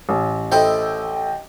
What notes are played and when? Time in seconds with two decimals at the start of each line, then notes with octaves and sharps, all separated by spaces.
0.09 A1
0.52 E4 A4 C5 D#5 G5